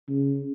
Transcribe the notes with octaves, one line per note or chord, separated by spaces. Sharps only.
C#3